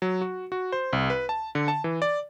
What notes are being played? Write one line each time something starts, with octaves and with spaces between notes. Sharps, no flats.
F#3
F#4
F#4
C5
C2
B4
A5
D3
A5
E3
D5